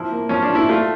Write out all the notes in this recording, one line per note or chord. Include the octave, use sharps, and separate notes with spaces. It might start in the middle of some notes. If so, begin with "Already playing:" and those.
Already playing: F3 E4
A#3
F3 C#4
D4
F3
E4
A3 F4